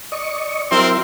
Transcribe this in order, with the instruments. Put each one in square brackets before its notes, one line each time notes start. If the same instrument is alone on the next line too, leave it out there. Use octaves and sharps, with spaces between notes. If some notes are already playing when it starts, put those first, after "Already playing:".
[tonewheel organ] D5 D#5 C#6
[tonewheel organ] F#3 E4 E5 [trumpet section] C4 A#4 C6